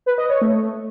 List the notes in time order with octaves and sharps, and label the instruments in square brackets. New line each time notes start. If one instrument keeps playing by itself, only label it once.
[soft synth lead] B4
D#5
C#5
A3